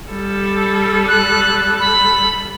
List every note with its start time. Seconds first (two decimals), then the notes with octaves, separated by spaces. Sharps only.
0.11 G3 A4
1.08 F#6
1.80 B5